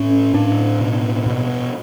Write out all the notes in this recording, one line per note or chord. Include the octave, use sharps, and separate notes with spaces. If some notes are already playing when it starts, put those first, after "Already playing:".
Already playing: A2 C#4
A2 D4
B2
B2